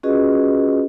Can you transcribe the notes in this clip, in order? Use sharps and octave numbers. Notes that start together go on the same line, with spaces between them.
C#4 F4 F#4 G#4 B4 D#5